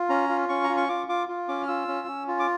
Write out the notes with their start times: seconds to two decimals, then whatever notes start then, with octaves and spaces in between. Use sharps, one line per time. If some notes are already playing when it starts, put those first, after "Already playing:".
Already playing: F4
0.09 C#4 A#5
0.29 F4
0.49 C#4 C#6
0.64 A#5
0.69 F4
0.77 C#6
0.89 F4 D6
1.08 F4 D6
1.29 F4
1.48 C#4 D6
1.63 F6
1.68 F4 E6
1.88 C#4
2.07 C#4
2.28 F4
2.40 D6